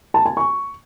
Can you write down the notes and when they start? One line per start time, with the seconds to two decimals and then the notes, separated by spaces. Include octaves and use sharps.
0.14 A5
0.26 G#5
0.37 C#6